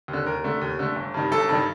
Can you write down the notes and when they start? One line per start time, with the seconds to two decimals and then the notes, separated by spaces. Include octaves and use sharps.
0.08 D#2
0.13 D3
0.26 D#2 A#4
0.44 D3 A3
0.62 D#2
0.79 D3 A3
0.96 G1
1.14 G2 D#3 G3
1.32 G1 A4
1.49 G2 D#3 G3